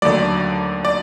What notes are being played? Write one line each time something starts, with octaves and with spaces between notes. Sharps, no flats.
D#2 D3 F#3 A3 D5
D5